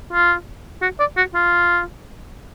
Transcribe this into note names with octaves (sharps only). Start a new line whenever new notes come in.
F4
F#4
D5
F#4
F4